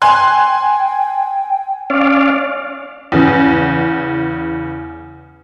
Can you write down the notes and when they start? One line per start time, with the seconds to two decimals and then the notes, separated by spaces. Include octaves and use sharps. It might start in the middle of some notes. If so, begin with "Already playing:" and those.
0.02 G5 G#5 C6 F#6
1.90 C#4 D5 F5
3.12 E2 C#3